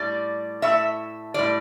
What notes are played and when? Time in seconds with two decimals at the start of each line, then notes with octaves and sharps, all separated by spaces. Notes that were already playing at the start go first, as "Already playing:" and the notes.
Already playing: A2 G3 D5
0.62 A2 A3 E5
1.34 A2 G3 D5